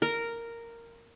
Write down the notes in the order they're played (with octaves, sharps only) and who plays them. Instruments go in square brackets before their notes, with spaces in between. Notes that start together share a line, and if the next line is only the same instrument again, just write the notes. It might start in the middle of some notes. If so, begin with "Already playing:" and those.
[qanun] A#4